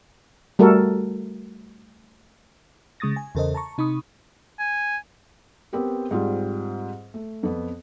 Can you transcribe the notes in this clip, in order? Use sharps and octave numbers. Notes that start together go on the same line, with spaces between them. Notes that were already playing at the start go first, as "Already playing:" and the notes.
G3 A3 F#4 A4 A#4
C#3 G#3 C#6 D#6 A6 A#6
G#5
E2 C#3 A4 A#4 C5 D#5
A5 A#5 C#6
C3 D#4 B5 C#6 D#6
G#5
B3 C4 G4 A#4
G#2 G3 C4 F4
A3
F2 B3